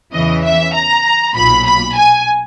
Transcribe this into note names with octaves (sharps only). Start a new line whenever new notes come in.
E2 C#3 E3 D#5
E5
A#5
B1 A#2 B5
B5
G#5